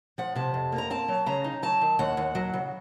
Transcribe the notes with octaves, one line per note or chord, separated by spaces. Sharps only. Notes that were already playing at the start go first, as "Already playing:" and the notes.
F3 F#5
C3 A5
F2
A#3
A#5
C4 A5
F#3
C#3 A#5
D#4
F#3 A5
D#3
D#2 F#5
D#2
F#3
C#3